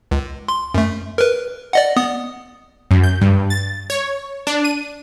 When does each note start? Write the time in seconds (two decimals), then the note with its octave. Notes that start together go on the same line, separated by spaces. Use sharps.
0.11 C#2
0.48 C6
0.74 F#2 A3
1.18 A#4 B4
1.73 D5 D#5 F#5
1.96 B3 D#6
2.91 F#2
3.03 G6
3.21 G2
3.50 A6
3.90 C#5
4.47 D4
4.64 D#7